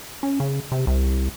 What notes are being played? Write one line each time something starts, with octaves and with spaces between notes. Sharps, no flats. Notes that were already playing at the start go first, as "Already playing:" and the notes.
C#4
C#3
C3
C2